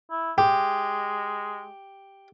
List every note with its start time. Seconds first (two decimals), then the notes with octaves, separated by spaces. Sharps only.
0.11 E4
0.38 G#3 G4